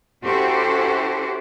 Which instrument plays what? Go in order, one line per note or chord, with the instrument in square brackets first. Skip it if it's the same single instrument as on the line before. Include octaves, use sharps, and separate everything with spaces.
[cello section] C#4 E4 F#4 G4 A4 C5